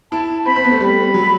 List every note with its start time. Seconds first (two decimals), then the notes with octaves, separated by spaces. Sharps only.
0.12 E4 A5
0.46 C4 B5
0.56 C4
0.64 B3
0.71 A3
0.80 G3 B5
1.14 F#3